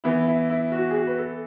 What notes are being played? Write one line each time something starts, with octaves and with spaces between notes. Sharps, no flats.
E3 B3 E4
E4
E4
F#4
G#4
F#4
B4
A4